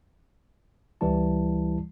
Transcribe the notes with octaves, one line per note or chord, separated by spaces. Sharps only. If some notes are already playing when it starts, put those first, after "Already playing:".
C#2 E3 G3 E4 A5